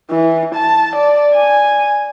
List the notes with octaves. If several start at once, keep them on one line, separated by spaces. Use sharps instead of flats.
E3
A5
D5
G#5